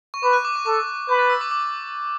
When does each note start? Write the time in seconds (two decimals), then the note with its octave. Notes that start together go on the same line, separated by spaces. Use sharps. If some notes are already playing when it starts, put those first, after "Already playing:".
0.14 C#6
0.23 B4 D6
0.33 F#6
0.45 D6
0.56 C#6
0.66 A4 D6
1.09 B4 G6
1.19 A6
1.30 E6
1.41 D6
1.51 D6